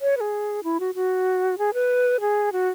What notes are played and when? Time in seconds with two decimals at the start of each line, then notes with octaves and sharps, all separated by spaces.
0.01 C#5
0.17 B4
0.21 G#4
0.64 E4
0.80 F#4
0.95 F#4
1.58 G#4
1.74 B4
2.20 G#4
2.52 F#4